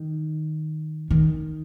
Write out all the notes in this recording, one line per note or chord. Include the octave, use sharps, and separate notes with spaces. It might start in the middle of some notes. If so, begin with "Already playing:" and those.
Already playing: D#3
D#3